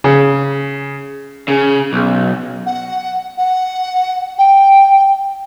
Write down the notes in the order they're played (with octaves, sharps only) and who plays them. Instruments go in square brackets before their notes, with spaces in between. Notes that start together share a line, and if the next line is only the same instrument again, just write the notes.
[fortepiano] C#3
[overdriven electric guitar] C#3
B1
[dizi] F#5
F#5
G5